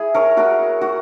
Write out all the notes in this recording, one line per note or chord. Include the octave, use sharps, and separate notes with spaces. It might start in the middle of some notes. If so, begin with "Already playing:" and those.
Already playing: E4 G#4
A#4 C#5
F#4 A#4
F#4